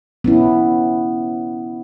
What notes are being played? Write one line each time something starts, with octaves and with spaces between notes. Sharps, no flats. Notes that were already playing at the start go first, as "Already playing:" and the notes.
B3 C#4 E4